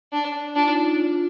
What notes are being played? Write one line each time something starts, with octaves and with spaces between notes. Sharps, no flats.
D4
D4 F4
D#4
D#4
F4